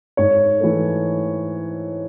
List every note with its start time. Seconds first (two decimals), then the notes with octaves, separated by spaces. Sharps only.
0.17 G#2 C#5
0.60 E3 A3